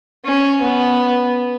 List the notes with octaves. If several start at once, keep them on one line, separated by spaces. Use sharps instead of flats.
C#4
B3